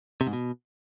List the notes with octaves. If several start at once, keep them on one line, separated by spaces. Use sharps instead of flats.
C3
G#2
B2